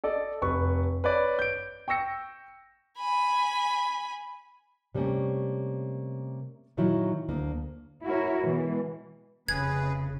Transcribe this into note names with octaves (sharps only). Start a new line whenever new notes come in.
A4 D5 D#5
F1 B4 C#6
B4 C#5 D5
G6 D7
G5 C#6 E6 A#6 C#7
G#5 B5
C3 G3 A3 A#3 C#4
A#2 D#3 F#3 E4
D2 A#3 D4
E4 F#4 A#4 C#5
B2 E3 G#3
F1 C#3 G#4 B4 G#6